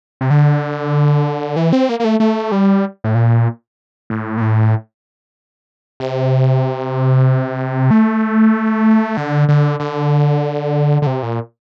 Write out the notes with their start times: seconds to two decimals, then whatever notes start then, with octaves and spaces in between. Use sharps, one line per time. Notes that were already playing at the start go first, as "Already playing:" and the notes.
0.21 C3
0.30 D3
1.56 E3
1.73 C4
1.89 A#3
2.00 A#3
2.05 A3
2.20 A3
2.52 G3
3.04 A2
3.15 A#2
4.10 A2
4.37 A#2
4.41 A2
6.00 C3
7.91 A3
9.17 D3
9.48 D3
9.80 D3
11.02 D3
11.07 C3
11.23 A#2